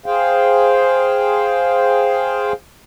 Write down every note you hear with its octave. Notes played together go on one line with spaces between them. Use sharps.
G#4 C5 F5 G5